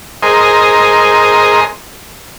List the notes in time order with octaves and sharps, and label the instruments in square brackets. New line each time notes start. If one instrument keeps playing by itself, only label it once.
[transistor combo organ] G#4 A#4 C5 D#5